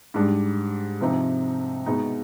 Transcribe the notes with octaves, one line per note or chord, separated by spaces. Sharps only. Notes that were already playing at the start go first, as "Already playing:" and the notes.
G#2 G3 D4
C3 F3 C4 D#4
B2 G#3 B3 D#4